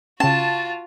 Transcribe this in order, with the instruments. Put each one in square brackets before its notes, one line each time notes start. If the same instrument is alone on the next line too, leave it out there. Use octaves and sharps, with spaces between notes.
[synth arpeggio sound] C#3 C#4 [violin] F4 F#4 [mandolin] A5